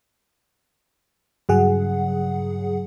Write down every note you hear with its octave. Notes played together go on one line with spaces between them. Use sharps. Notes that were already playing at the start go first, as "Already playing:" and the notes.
G2 C#3 F#3 G#4 F#5